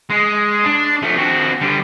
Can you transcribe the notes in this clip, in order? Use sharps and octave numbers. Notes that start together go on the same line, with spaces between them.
G#3
D4
F3 A3
C4 F#4
D3 G3